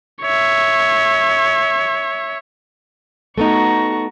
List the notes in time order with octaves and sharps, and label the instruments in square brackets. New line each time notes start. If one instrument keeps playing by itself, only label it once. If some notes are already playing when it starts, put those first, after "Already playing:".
[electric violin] C#5 E5
[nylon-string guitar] A3 B3 D#4 [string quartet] F#4 A#5 C#6